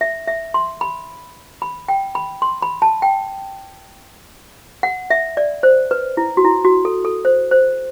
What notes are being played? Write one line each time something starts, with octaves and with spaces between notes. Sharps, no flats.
E5
E5
C6
B5
B5
G5
B5
C6
B5
A5
G5
F#5
E5
D5
C5
B4
E4
F#4
E4
F#4
A4
A4
C5
C5